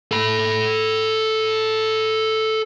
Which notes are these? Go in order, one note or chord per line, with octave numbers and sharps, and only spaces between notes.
A4 B5